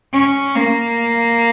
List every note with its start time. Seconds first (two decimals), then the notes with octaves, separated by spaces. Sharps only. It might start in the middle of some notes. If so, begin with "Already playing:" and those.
0.13 C#4
0.56 A#3